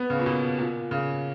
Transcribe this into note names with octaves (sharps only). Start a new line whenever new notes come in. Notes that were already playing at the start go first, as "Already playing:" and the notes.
Already playing: B3
C#3
A#2
B2
A#2
C#3